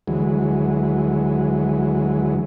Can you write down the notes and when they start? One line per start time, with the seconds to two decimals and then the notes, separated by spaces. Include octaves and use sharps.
0.08 D2 E3 F#3 G#3